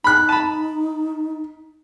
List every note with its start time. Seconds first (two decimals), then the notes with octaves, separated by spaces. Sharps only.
0.04 D#4 B5 F#6
0.29 A5 B5